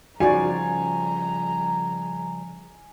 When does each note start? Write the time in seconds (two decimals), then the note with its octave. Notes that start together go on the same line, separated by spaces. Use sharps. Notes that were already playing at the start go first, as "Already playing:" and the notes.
0.20 C#3 F3 G3 D#4 F#4 D5 G#5 A#5